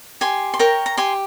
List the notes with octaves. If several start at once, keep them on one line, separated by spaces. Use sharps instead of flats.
G4 G#5 C6
C6
A#4 C#5 G5 A#5
A#5
G4 G#5 C6